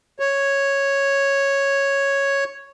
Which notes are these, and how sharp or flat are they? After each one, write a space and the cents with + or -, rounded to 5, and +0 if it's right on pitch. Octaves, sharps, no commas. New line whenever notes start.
C#5 -5